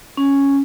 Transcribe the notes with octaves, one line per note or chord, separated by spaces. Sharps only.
C#4